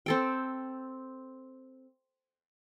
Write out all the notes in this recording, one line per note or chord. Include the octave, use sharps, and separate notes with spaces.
C4 A4 G5